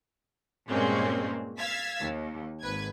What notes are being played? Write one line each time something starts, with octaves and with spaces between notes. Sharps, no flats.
G2 A#2 G#3 A#3 C4 C#4
F5 E6 G#6 A6 B6
D#2
G#1 B4 G#6